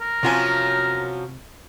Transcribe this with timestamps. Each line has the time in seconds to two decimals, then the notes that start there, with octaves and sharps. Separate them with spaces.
0.01 A#4
0.23 C3 F3 F#3 C#4 F4 G#5